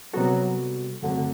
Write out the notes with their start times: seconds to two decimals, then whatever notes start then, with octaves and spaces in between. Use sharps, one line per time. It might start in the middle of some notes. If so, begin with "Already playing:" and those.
0.13 C3 F#3 G3 B3 F#4 A4
1.02 F#2 D3 F#3 A3 C4
1.17 D3